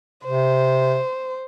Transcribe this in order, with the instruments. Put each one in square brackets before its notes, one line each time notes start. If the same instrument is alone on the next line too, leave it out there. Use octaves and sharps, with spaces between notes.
[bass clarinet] C3 [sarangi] C5